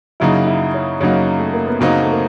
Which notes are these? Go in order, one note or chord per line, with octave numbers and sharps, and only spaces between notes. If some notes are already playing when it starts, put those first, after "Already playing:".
F#2 C#3 F#3 A#3 D#4 E4
E4
C#4
F#2 C#3 F#3 A#3 C#4 D#4
A3
A#3
B3
F#2 C#3 F#3 A#3 C4 D#4
A3
A#3